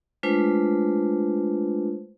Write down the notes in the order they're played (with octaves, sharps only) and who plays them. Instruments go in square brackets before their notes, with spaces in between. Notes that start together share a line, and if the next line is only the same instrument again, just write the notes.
[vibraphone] G#3 A3 D4 F4 B4 C5